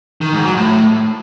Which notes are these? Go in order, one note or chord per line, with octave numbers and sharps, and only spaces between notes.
D#3
G#2
F#3
A2